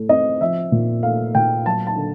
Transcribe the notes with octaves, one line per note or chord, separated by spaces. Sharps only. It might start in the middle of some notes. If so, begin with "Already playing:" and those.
Already playing: A2 A3
C4 D#5
F3 E5
A#2
A3 F5
A#2 G5
F#3 A5
A5
D3